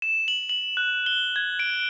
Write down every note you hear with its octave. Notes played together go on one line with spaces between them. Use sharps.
E7
F#7
F#7
F#6
G7
G#6
D7